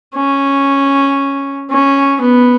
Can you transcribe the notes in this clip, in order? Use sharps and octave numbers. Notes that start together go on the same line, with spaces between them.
C#4
C#4
B3